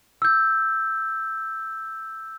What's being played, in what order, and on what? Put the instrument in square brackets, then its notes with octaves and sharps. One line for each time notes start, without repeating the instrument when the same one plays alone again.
[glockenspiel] E6 G6